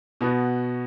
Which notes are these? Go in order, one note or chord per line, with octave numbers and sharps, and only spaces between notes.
B2 B3 F#4